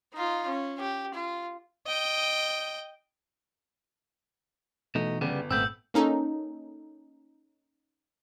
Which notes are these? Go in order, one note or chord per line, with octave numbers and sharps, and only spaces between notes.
D#4 F4
C#4
G4
F4
D#5 G5
B2 E3 A3 D#4
G1 C#3 G3 B3
G#1 A#2 A3 B3 C4 E6 G6
A#3 C#4 D#4 A4